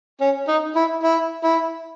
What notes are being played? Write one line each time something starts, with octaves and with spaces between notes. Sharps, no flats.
C#4
D#4
E4
E4
E4